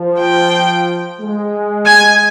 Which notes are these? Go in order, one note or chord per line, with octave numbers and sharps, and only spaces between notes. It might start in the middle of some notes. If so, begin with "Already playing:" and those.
Already playing: F3
G5
G#3
G#5